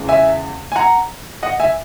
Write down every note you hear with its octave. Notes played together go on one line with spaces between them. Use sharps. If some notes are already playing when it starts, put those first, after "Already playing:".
Already playing: E2 C#3 G#3
E5 G#5
G#5
F#5 A#5
D#5 F#5
E5 G#5